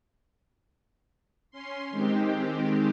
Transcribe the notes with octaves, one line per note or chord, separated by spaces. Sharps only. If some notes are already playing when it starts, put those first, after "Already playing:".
C#4 C6
D#3 G#3 C4 G4